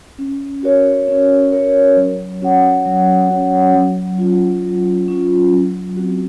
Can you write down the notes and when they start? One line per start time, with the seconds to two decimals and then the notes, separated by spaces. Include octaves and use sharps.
0.19 C#4
0.63 F#4 A#4 C#5
1.08 C#4
1.52 F#4 A#4 C#5
1.96 F#3
2.41 C#4 F#4 C#5 F#5
2.85 F#3
3.29 C#4 F#4 C#5 F#5
3.74 F#3
4.19 C#4 F4
4.63 F#3
5.08 C#4 F4
5.52 F#3
5.97 C4 F#4